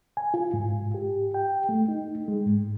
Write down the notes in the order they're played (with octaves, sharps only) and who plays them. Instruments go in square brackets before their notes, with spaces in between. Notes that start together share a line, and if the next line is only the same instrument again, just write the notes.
[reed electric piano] G#5
F4
G#2
G4
G5
A3
D#4
G#3
G#2